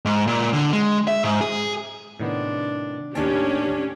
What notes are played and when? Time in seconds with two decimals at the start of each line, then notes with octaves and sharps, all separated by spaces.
0.05 G#2
0.27 A#2
0.53 D3
0.73 G#3
1.07 E5
1.24 G#2
1.41 G#4
2.20 A2 C3 D#3 B3 D4
3.15 D#2 A2 D#3 C#4 D4 G4 A5